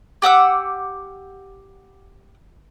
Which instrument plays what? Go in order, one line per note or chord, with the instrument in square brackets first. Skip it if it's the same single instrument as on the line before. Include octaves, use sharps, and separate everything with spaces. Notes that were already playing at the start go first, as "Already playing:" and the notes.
[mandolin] G4 F#5 D6 E6